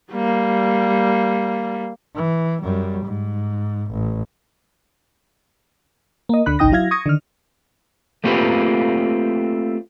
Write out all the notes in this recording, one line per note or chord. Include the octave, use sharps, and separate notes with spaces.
G3 A#3
E3
F#2 G3
G#2
A1
A#3 D#5
D2 D3 B5 F#6
G#1 C#2 D#4 G5 D#6 A#6
F#3 E4 F5 G#6 A#6
C#6 D#6 G#6 A#6
D3 D#3 F6
A3 A#3 C4 F4 G4 B4